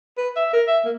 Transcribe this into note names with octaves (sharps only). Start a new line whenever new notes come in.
B4
E5
A#4
E5
A#3